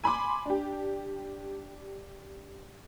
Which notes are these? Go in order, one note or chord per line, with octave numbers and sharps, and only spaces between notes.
G#5 B5 C6 D6
D4 G4